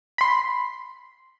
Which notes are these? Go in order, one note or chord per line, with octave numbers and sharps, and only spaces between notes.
B5 C6